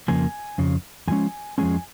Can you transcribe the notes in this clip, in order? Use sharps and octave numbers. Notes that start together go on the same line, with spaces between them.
F2 C#3 F3 A#3 G#5
F2 C#3
F2 F3 G#3 C#4 G#5
F2 F3 G#3 C#4 G#5